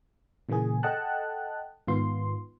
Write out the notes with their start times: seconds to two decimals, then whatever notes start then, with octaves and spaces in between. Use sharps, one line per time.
0.49 A#2 C#3 E3 A#3 G#4
0.83 A4 D#5 F#5 G5 A5 F#6
1.87 G#2 D#3 B3 F4 C6